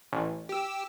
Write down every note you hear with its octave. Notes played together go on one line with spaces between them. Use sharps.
A1
G4 E6